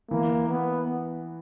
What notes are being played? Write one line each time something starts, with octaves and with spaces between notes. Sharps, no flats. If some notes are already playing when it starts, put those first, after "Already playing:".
E3 A#3
B3